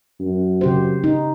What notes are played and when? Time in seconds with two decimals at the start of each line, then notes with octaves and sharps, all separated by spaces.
0.20 F#2
0.61 C#3 G4 C5
1.04 D#4